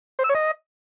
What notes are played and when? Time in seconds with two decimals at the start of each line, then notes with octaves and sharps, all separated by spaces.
0.19 C5
0.24 E6
0.29 C#5
0.35 D#5